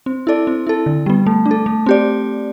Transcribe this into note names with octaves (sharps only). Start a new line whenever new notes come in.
C4
E4 A4 D5
C4
E4 A4
D3
G3 B3
A3
D4
A4
A3
C4 G4 D5